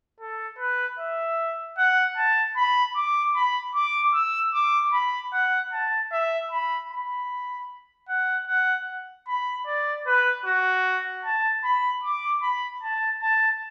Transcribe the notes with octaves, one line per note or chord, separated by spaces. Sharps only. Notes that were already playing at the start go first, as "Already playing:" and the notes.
A4
B4
E5
F#5
A5
B5
D6
B5
D6
E6
D6
B5
F#5
A5
E5
B5
B5
F#5
F#5
B5
D5
B4
F#4
A5
B5
D6
B5
A5
A5